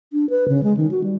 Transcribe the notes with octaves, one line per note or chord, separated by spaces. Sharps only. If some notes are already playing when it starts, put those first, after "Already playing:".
D4
B4
C#3
G#3
D#3
F#4
G3